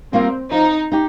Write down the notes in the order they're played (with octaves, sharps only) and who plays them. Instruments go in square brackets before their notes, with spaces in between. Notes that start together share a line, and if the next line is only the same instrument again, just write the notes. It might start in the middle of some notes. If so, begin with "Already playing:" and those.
[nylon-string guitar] G3 A#3 F4 A#4 [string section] C4
[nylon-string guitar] F3 [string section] D#4
[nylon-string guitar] D#4 G4